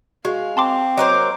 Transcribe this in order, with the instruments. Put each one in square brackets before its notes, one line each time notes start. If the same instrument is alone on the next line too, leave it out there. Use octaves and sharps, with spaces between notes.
[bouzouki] G#3 [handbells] F#4 [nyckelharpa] F5
[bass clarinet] C4 [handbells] A5 C6 D6
[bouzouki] F#3 A#4 C5 [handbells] D#5 [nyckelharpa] D6